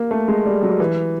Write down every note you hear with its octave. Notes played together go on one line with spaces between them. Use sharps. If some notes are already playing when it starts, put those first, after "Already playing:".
Already playing: A#3
A3
G#3
G3
F#3
E3